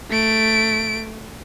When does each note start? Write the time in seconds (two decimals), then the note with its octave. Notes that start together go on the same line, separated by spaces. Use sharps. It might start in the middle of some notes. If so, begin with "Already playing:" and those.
0.10 A3 D7